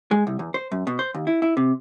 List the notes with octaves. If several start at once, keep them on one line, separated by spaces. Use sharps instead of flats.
G#3
C2
E2
C5
F#2
B2
C5
D#2
E4
E4
C3